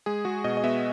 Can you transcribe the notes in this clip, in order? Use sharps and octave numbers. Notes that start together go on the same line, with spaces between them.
G#3 G#4
G#3 F#4
B2 D#5
D#5
B3 E5